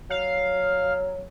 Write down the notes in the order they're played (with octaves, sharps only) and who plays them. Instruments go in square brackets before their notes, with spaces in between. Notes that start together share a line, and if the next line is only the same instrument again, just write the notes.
[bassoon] F#3 [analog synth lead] F5